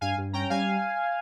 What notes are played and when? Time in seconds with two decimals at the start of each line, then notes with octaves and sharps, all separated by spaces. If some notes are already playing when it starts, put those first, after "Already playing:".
0.01 G2 F5 G#5
0.18 G2
0.33 C#4 G5 A#5
0.50 G3 F5 G#5